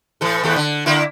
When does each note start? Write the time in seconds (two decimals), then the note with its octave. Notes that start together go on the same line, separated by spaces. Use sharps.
0.21 A2 E3 A4
0.43 D#2 A2 A4
0.56 D3
0.86 D3 A#3 E4